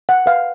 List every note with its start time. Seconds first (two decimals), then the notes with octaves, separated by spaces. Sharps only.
0.09 F#5
0.26 B4 F5